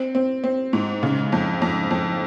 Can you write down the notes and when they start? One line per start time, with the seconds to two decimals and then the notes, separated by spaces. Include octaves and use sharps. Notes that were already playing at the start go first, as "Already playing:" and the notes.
Already playing: C4
0.15 C4
0.44 C4
0.73 G#2
1.03 C#3
1.32 F2
1.62 F2
1.91 F2